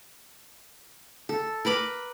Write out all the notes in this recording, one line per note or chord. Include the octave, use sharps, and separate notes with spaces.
A4
A#4 B4 B5 D6